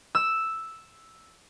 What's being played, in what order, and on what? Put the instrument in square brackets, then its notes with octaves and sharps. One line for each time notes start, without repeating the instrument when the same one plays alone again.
[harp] E6